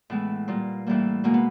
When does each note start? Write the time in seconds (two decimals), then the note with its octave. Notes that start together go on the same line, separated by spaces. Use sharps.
0.10 A2 E3 G#3 B3
0.48 A#2 G3 A#3
0.86 A2 E3 G3 A#3
1.24 B2 G#3 A#3
1.34 B3